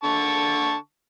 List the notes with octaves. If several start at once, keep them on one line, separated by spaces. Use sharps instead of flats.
D3 A5 C#6